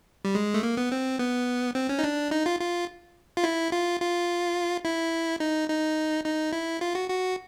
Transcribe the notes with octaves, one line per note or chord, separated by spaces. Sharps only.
G3
G#3
A3
A#3
B3
C4
B3
C4
C#4
D#4
D4
D#4
F4
F4
F4
E4
F4
F4
E4
D#4
D#4
D#4
E4
F4
F#4
F#4